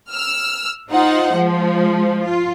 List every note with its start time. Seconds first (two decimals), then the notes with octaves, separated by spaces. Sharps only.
0.11 E6 F6
0.91 D#4 F4 C5 F#5
1.35 F3 G#3
2.23 F4